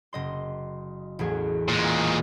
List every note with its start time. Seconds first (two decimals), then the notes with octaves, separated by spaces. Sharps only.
0.13 F#1 D#5 C6
1.19 A1 E2 G#4
1.69 A#2 G#3